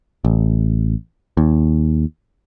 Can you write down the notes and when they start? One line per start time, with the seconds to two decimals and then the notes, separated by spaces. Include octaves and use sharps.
0.25 A1
1.37 D#2